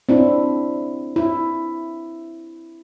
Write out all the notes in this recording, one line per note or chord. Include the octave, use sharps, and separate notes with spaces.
C4 D4 E4
E4